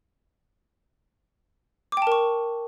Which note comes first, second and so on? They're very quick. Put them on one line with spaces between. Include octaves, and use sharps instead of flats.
D6 G5 A5 A#4 C#6